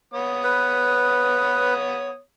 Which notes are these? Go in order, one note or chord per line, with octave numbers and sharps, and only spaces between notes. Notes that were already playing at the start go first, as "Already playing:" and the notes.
B3 C#5 D#6
B4